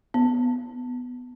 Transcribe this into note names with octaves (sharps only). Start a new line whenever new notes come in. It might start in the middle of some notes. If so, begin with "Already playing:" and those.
B3